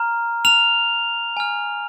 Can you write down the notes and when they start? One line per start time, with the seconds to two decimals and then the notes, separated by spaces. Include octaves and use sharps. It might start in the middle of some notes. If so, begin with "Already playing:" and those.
Already playing: A#5 F6
0.45 A#5 F6 F7
1.37 G#5 F6